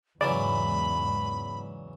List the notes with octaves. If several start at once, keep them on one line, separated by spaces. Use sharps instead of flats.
E2 G#2 C#3 E3 F#3 D5 B5